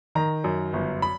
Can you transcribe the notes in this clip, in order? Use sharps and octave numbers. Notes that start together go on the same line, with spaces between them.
D#3 A#5
F#2
G1
B5